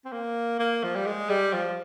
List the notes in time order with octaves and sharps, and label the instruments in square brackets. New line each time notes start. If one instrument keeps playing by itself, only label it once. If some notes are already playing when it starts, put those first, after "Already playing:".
[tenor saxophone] C4
A#3
A#3
F3
G3
G#3
G3
F3